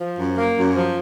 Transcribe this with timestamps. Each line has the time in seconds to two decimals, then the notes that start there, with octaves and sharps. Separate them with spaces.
0.01 F3
0.19 F#2
0.38 A#3
0.57 F#2
0.75 F3